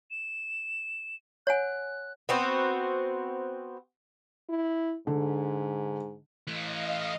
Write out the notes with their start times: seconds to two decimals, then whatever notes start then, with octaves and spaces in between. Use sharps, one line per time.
0.11 E7
1.47 C#5 F#5 G#5 F#6
2.29 B3 C4 F#4
4.49 E4
5.07 G#2 D3
6.47 E3 A3 D#5 F5